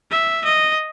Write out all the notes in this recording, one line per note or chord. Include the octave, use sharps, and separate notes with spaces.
E5
D#5